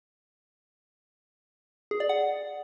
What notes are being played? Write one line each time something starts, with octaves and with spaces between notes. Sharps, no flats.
G#4
D5
F#5